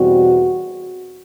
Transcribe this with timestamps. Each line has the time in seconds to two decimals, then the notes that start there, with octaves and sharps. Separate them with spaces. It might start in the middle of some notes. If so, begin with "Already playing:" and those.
Already playing: E2 B2 G3 C4 F#4